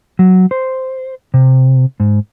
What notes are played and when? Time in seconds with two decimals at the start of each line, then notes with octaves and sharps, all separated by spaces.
0.19 F#3
0.51 C5
1.34 C3
2.00 G#2